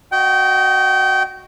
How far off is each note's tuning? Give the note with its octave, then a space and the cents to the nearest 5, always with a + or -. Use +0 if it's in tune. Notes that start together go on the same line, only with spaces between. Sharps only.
F#4 +0 D#5 +0 G5 -25